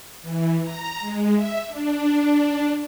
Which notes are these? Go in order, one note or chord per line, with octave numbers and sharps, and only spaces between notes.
E3
A#5
G#3
E5
D4